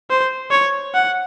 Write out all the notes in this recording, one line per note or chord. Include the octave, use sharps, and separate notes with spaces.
C5
C#5
F#5